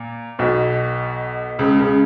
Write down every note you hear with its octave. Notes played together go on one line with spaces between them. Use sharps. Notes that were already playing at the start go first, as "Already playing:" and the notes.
Already playing: A#2
B1 B2
C#2 C#3
C#2 C#3